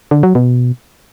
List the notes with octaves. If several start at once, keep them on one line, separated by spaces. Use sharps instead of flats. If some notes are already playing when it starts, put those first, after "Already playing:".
D3
F#3
B2